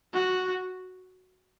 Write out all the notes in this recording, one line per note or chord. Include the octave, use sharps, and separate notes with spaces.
F#4